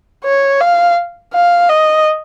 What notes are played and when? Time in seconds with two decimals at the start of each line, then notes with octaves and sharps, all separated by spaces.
0.24 C#5
0.60 F5
1.33 F5
1.69 D#5